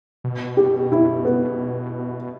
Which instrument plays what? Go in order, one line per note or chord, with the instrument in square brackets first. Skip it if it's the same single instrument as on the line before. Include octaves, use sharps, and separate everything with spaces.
[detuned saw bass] B2
[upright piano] G4
E4
B3